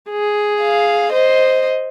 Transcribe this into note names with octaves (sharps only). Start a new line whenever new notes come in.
G#4
F5
C5 D#5